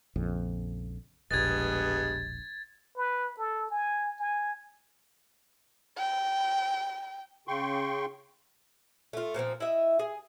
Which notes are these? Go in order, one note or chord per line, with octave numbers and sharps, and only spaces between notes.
A#1 F2 C#3
E1 A#1 G2 G#3 B3 G#6 A6
B4
A4
G#5
G#5
G5
C#3 G5 C6 C#6
A3 F4
A#2 F3 A#3 C4
E4 D#5 E5
G#4